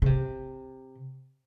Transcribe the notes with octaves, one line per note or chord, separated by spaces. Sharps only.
C#3
C3